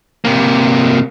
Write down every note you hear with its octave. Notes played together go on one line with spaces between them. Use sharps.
C3 A#3